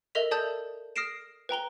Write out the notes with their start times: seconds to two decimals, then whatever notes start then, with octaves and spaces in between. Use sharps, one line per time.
0.15 A4 A#4 D#5 E5 B6 F7
0.31 A4 D5 A5 D#6 G6
0.96 D#6 F6 A#6 C7 D7 E7
1.49 B4 G5 A#5 G7